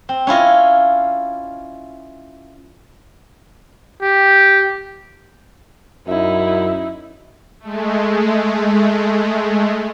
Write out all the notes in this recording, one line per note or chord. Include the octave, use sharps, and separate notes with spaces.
C4
C#4 E4 F4 D#5
G4
F#2 D#4 E4
G#3 A3